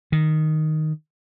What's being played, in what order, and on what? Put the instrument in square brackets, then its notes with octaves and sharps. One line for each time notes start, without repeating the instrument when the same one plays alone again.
[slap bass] D#3